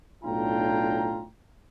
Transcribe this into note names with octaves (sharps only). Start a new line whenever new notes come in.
B1 A2 D4 F4 G5 A#5